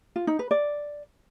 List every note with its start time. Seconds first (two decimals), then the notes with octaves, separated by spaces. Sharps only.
0.16 F4
0.27 D#4
0.39 B4
0.51 D5